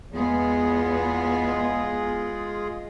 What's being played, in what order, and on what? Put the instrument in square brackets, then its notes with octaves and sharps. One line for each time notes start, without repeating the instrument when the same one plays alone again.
[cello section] E2 B3 [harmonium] G#3 F4 G#4